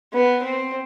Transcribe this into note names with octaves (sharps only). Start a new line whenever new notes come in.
B3
C4